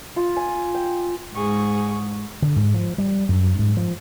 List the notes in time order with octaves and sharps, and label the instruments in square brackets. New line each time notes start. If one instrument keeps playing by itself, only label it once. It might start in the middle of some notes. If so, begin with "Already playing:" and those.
[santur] F4
G#5
G5
[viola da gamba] G#2 [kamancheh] G#4 C#6
[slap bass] D3
G#2
F3
G3
F#2
G#2
F3